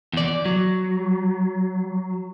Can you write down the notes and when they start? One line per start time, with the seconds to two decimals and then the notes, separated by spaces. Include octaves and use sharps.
0.13 E2 D5
0.45 F#3